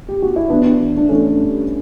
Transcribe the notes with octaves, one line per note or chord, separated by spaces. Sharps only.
G4
F#4
E4
E3 B3 D4
E3
D4
E3 A3 C#4
G2